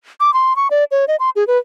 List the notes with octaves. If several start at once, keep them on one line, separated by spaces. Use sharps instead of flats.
D6
C6
C#6
D5
C#5
D#5
C6
G#4
B4